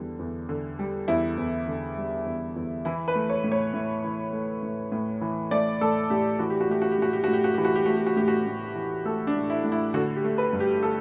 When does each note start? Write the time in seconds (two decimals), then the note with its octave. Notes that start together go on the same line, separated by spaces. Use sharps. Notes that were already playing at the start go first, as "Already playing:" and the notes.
Already playing: E2 D3 G3
0.19 E2
0.49 D3
0.79 G3
1.08 E2 E4
1.38 E2
1.68 D3
1.97 G3
2.26 E2
2.56 E2
2.85 E3 E4
3.08 B4
3.15 A3
3.30 C#5
3.44 A2
3.52 C#5
3.74 A2
4.04 E3
4.33 A3
4.63 A2
4.92 A2
5.21 E3
5.51 A3 D5
5.81 A2 A4
6.10 A2 G4
6.39 E3 F#4
6.50 G4
6.61 F#4
6.70 A3 G4
6.82 F#4
6.92 G4
6.98 A2 F#4
7.13 G4
7.24 A2 F#4
7.33 G4
7.44 F#4
7.54 E3 G4
7.65 F#4
7.76 G4
7.86 A3 F#4
7.97 G4
8.06 F#4
8.16 A2 G4
8.28 F#4
8.46 A2
8.75 E3
9.05 A3 A4
9.27 D4
9.36 A2
9.50 E4
9.64 A2
9.72 E4
9.94 D3 F#4
10.16 G4
10.24 A3
10.38 B4
10.53 G2
10.60 G4
10.83 A4